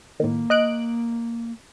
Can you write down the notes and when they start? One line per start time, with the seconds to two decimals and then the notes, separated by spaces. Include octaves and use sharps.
0.20 A2 D#3 A#3
0.50 D#5 F#6 D7